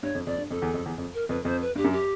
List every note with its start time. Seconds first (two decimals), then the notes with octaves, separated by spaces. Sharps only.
0.02 G2 C#5
0.15 F2
0.26 F2 D5
0.38 G2
0.50 F2 A4
0.62 E2
0.74 F2
0.86 E2
0.98 F2
1.14 A#4
1.29 F2 B4
1.45 F2 C5
1.61 B4
1.76 G2 G4
1.84 F#2
1.92 G4